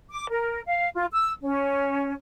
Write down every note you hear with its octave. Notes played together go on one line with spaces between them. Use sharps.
D6
A#4
F5
F4
E6
C#4